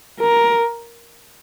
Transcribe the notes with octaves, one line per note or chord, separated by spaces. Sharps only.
A#4